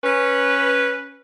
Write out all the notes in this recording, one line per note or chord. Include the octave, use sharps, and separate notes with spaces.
C#4 B4